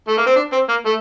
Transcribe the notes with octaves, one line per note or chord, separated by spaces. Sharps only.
A3
A#3
C4
D4
C4
A#3
A3